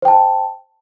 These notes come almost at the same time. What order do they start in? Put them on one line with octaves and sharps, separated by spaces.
C5 G5 A5